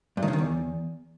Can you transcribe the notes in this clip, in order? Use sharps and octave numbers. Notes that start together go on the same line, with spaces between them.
G2
D#3
C#3
D#3
E2